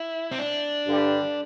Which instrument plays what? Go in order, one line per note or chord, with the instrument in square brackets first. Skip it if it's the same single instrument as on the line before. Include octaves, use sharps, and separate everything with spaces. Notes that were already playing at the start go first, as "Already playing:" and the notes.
Already playing: [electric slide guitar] E4
C4
D4
[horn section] G2 D3 G3